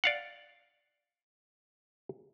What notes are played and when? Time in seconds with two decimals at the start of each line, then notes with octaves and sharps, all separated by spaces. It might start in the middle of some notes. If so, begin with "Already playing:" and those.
0.04 D5 F5 F#5